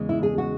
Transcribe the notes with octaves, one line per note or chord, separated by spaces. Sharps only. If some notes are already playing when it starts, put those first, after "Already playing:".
Already playing: E2 C#3 G#3
E4
G#4
F#4